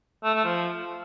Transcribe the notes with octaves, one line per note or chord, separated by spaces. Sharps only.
A3
A3
F3